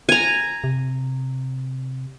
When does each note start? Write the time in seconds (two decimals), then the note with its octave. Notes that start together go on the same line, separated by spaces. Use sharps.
0.09 G#5 A#5
0.64 C3